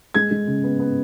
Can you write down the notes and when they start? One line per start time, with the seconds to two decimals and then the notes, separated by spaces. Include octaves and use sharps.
0.14 G#3 G#6
0.31 G#3
0.47 C#3
0.64 B3
0.79 B3